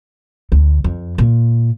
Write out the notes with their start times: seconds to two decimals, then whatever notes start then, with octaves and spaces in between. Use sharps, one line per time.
0.52 D2
0.84 F2
1.18 A#2